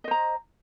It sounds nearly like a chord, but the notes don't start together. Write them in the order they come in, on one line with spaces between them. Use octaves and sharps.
D#5 C5 A#5